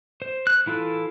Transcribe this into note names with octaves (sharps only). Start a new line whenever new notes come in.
C5
F#6
E3 E4 F4 A4